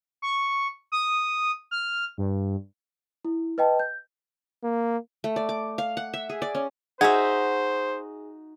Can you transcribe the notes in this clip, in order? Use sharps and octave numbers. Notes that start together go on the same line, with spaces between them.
C#6
D#6
F6
G2
E4
B4 D#5 G5 A5
G6
A#3
A3
D5
D6
F5
F#5
E5
G#4
D5
C#4
D#4 F#4 G#4 C5 E5 F#5 G#5 G#6